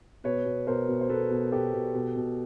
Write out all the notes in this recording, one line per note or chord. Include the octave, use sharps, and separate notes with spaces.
B2 B4 C#5
B2
B2 A#4 C5
B2
C5
B2 A4 B4
B2
B2 G4 A4
B2
B2
B2